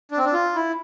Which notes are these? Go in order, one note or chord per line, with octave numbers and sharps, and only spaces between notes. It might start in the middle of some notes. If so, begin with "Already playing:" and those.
D4
C4
D4
F4
E4